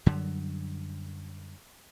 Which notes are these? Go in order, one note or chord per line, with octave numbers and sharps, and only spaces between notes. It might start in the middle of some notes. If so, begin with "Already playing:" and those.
F#2 D3 F#3 G3